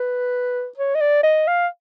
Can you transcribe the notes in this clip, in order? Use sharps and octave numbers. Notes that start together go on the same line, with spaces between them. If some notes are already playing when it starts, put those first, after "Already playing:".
Already playing: B4
C#5
D#5
D5
D#5
F5